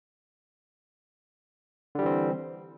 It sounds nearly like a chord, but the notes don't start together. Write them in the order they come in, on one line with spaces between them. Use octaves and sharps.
D3 G3 E3 C4